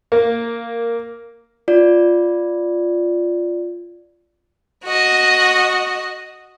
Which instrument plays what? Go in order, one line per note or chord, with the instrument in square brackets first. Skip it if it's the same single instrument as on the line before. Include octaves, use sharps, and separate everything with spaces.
[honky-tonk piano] A#3
[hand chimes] F4 D5
[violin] F#4 D#5